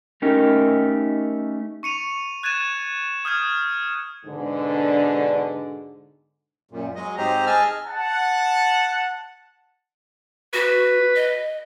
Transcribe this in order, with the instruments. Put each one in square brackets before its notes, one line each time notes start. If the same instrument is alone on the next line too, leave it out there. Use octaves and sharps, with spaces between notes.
[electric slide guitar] A3 C#4 D#4 G4 A#4 D#5
[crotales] C#6 C#7 D#7 F7
F#6 G#6 A6 D#7 E7
D#6 F6 G6 G#6 E7
[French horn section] G#2 B2 D3
[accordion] F#2 A#2
F#3 G#3 D#5
G#2 C4 G4 C5 D#5 A#5
G#4 D#5 G#5 A5 E6 F6
[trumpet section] F#5 A5
[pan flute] F#4 [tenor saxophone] B4
[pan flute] D#5